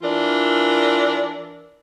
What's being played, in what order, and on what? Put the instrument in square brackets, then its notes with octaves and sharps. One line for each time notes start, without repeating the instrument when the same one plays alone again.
[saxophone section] E3 D4 F4 A#4